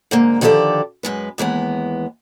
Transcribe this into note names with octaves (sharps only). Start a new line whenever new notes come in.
G#2 D3 A#3
D3 D#3 F3 G4 A4 D5
F#2 B2 G#3 B4
D#2 E3 G#3 B3